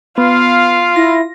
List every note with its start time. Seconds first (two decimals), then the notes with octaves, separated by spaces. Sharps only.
0.18 B3 F4 F5
0.96 E4 A#6